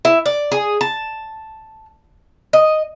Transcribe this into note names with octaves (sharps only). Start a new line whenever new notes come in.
E4
D5
G#4
A5
D#5